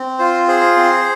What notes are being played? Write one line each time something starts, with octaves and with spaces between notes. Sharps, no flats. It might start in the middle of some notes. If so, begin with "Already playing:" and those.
Already playing: C4
F4 C5
G#4 C5
C4